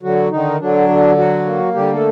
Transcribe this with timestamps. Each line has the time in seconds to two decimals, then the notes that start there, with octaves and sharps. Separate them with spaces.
0.03 D3 F#3 F#4
0.31 D3 D#3 D#4
0.60 D3 F#3 D4
0.88 D3
1.17 F#3 F#4
1.45 A#3
1.74 D3 G3 G4
1.93 A3 A4